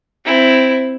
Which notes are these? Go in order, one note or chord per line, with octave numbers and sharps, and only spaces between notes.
C4 E4